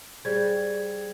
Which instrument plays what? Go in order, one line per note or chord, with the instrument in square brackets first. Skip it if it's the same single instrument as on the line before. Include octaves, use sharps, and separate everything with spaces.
[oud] G3 [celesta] G#4 C5 G#6